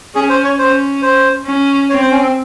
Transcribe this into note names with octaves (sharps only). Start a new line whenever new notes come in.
C#4 G#4
C5
C#5
C#4 C5
C5
C#4
C4 C#5
C5
C#4
C4